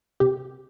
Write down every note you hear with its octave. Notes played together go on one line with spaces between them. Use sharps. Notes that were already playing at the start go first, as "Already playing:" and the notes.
C3 G4